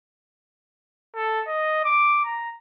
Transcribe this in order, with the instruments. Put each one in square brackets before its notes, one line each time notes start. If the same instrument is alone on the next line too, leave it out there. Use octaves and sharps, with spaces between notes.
[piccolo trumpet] A4
D#5
D6
A#5